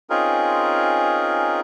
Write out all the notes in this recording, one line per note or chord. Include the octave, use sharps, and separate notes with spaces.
C4 C#4 D#4 F4 G#4 A#4